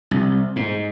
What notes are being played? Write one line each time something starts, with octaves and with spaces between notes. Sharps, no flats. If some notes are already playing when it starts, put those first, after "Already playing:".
C2
G#2